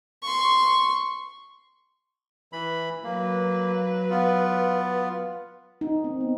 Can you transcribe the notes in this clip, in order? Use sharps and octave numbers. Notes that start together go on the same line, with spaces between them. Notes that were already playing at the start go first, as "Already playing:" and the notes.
C6 C#6
E3 B5
F#3 A#3 B4
B3 F4
D#4
C4
B3